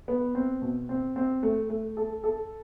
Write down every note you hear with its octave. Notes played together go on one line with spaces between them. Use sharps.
B3
C4
B2
C4
C4
A3
A3
A4
A4